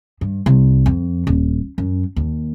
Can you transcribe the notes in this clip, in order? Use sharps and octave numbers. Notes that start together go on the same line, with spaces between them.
G2
C2
F2
D#1
F#2
D#2